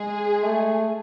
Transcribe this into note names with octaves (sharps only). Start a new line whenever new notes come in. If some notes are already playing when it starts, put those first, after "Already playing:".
Already playing: G#3 G#4
A3